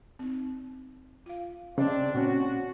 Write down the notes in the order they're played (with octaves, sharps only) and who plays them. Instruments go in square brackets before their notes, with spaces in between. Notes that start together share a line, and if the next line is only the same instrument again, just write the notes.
[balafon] C4 D#4
F4 F5
[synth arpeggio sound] C#3 [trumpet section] C4 D4 [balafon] D#5
[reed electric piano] A#2 C#4 [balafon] C4 [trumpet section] F#4